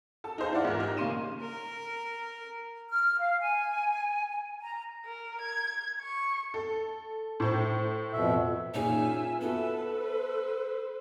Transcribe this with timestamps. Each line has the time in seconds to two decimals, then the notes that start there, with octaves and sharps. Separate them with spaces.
0.24 A4 A5
0.38 D#4 G#4 C5 F5
0.53 E4 F4 D5 F#5
0.65 G#2 A#4
0.79 D#4 G4 A#4
0.97 C#3 A#3 C#4 C6 D#7 E7
1.41 A#4
2.89 F6
3.19 F5
3.39 G#5
4.61 A#5
5.05 A#4
5.41 G#6
6.01 C#6
6.54 A4
7.40 A2 C5
8.13 F2 B2 E5
8.74 A#2 C#4 D#4 F4 G#4 E5 G#5
9.41 B3 F#4 A4 B4 E5 A5
9.97 C5